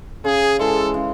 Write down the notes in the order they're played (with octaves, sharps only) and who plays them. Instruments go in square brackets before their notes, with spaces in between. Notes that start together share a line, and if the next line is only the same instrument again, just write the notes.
[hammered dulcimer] C#3 [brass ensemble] G#4
[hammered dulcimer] E3 G#3 [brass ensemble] A4
[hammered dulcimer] C#3